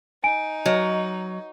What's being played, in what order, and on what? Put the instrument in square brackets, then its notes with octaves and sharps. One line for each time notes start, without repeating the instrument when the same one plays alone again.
[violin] D#4 [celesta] G#5 D7
[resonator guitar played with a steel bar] F#3 [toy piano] B4 C#5 D#5